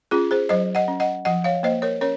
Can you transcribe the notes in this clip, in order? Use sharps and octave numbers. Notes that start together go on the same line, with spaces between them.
C#4 F4 G#4
G#4 C5
F#3 C5 D#5
D#5 F#5
C#4
D#5 F#5
F3 D#5 F#5
C#5 F5
A#3 C5 D#5
A#4 C#5
C#4 A#4 C#5